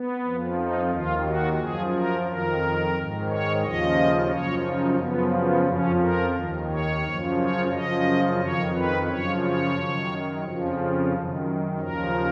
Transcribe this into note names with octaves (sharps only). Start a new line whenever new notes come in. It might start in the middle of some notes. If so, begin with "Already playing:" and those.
Already playing: B3
F2 F3
D#4
D#2 D#3 F4
F#4
F#2 F3 G#4
A#4
F2 D#3 A#4
G#2 D#3
C#5
D#2 C#3 F3 D#5
F#2 C#3 F3 C#5
D#4
F#2 C#3 F3 B3
B3
F2 F3 C#4
A#4
D#2 D#3
C#5
F#2 C#3 F3
C#5
F#2 C#3 F3 D#5
F2 D#3 C#5
B4
F#2 C#3 F3 C#5
C#5
F#2 D#3
F2 C#3 F3
F#2 D#3
D#2 C#3 F3 A#4